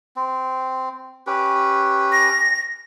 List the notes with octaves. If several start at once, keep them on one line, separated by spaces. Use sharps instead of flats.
C4
C#4 G4 B4
A#6